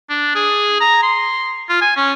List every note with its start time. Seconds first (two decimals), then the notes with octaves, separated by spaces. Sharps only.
0.10 D4
0.35 G#4
0.80 A#5
1.03 C6
1.69 F4
1.81 G#5
1.96 C#4